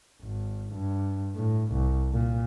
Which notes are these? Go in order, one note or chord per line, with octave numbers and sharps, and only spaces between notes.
G#1
G2
A2
C2
A#2